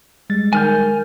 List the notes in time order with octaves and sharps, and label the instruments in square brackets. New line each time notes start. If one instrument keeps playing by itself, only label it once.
[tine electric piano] G3 G#3 A6
[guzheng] D#3 [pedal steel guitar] G#5 F6 G6